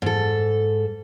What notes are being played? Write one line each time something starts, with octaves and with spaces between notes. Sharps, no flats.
G#2 A4